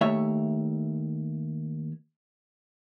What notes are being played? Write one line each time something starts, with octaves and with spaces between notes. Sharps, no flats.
D#2 A3 C#5 E5